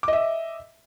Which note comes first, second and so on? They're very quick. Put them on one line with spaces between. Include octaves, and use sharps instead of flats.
D6 D#5 E5